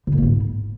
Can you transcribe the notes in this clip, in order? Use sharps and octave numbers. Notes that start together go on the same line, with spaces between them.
D3
A#2
A#3
G#2